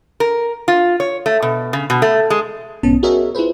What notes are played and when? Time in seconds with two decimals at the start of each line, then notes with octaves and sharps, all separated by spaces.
0.20 A#4
0.68 F4
1.00 C#5
1.26 A3
1.42 B2
1.73 C#3
1.90 B2
2.02 A3
2.30 G#3
2.83 B1 G#2 B3 C#4 A5
3.03 F#4 G#4 A#4 C#5 D#5 E5
3.35 E4 F4 G#4 B4 C5